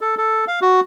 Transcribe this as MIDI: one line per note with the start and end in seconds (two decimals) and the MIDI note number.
0.01 0.15 69
0.18 0.45 69
0.48 0.60 77
0.62 0.80 66